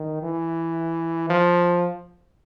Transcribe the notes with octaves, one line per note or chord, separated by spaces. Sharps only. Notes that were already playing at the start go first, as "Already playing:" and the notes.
Already playing: D#3
E3
F3